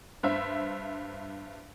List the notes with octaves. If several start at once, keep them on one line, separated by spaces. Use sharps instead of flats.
G2 C5 E5